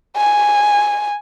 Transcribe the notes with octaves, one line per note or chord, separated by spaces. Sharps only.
G#5